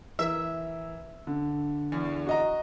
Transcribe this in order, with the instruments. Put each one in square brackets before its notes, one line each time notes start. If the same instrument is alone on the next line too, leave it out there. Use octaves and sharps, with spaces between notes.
[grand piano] E3 A#4 [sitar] E5
[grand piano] D3
[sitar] E2
[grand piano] F#4 D#5 A#5